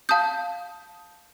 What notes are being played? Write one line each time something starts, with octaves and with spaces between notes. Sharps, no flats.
F5 A5 D#6 G6